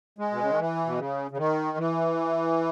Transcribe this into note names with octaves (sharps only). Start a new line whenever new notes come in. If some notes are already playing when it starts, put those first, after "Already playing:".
G#3
B2
C#3
D#3
E3
B2
C#3
C#3
D#3
E3